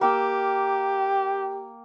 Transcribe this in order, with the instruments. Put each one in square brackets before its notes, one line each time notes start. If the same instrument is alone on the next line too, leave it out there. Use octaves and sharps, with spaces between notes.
[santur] A#3 G5 E6 [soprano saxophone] G4